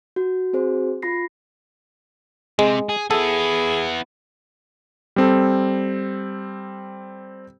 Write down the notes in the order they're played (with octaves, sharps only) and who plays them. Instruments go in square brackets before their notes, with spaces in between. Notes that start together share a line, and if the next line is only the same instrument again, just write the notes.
[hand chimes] F#4
C4 F#4 G#4 C5
F4 B5 A#6 C7
[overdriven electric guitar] C3 [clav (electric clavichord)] G#3
[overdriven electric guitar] G#4
[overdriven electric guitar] B3 E4 [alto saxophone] G#4 [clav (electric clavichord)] A4
[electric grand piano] G3 C4 A4